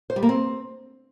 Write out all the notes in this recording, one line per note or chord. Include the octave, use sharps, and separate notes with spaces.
C5
G3
A#3
C4